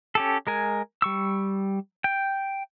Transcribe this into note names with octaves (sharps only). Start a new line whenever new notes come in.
C#4 G4 A4
G#3 A#4 G#5
G3 C#6 E6
G5